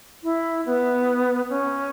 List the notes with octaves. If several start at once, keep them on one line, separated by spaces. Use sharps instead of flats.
E4
B3
C#4